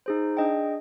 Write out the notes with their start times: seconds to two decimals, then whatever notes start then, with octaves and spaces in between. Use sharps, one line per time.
0.06 D#4 G#4 C5
0.37 D4 G#4 D#5 G5